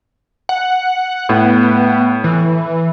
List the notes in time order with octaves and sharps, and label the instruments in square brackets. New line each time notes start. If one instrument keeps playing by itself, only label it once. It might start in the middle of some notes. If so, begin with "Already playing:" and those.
[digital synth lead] F#5
[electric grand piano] A2 [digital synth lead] B3
[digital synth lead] E3